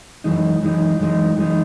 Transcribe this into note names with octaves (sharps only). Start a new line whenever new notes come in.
F#2 E3 G#3 D#4
F#2 E3 G#3 D#4
F#2 E3 G#3 D#4
F#2 E3 G#3 D#4